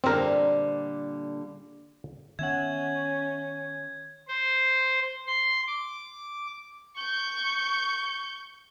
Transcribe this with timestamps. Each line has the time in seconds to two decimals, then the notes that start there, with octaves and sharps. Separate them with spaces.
0.04 A#2 D3 G3 C4 A#4
2.39 D#3 B3 C#4 E5 F#5 G#6
4.28 C5
5.27 C6
5.67 D6
6.96 C#6 G6